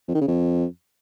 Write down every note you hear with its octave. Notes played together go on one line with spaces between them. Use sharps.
F2
D#3
C#3
F2